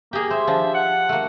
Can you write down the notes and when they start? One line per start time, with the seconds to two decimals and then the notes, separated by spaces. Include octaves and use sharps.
0.13 A#3 G4 G#4
0.30 C5 E5
0.47 F3 D4
0.74 F#5
1.09 A3 A#3